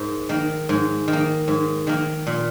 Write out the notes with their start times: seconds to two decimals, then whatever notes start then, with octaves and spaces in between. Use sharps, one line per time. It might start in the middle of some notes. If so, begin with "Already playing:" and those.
Already playing: G#2 A#3
0.29 D#3 A#3
0.69 G#2
1.08 D#3
1.13 A#3
1.48 G#2
1.87 D#3 A#3
2.27 A#2